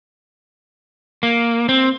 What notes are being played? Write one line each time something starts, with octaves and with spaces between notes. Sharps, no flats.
A#3
C4